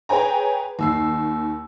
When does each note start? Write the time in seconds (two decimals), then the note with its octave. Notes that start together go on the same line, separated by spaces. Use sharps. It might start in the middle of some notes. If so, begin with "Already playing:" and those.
0.09 G#4 B4 C#5 G5 G#5 A#5
0.79 D#2 E6 C7